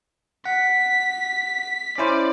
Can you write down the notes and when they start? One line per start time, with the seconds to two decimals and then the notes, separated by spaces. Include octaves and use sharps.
0.46 F#5 B6
1.98 C#4 E4 C5 D5